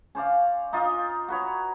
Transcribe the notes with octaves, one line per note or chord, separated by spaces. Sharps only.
C#4 C5 D5 F5
D#4 F4 D#5
F#4 B4 C#5